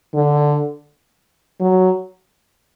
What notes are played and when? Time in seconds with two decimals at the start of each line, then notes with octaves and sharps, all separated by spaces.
0.15 D3
1.61 F#3